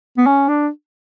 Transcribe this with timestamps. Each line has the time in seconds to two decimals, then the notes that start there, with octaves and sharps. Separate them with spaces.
0.18 B3
0.26 C#4
0.49 D4